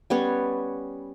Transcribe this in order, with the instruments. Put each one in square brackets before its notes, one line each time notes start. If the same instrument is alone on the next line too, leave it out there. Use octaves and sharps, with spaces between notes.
[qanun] G3 B3 C#4 C#5